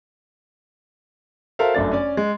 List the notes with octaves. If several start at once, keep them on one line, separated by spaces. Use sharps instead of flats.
F#4 A4 A#4 C5 E5 F5
G1 F#2 A3 D4 A6
C#4 D5
G#3